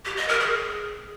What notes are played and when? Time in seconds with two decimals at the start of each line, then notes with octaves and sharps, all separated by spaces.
0.05 G4
0.17 D#5
0.29 A#4
0.40 G#4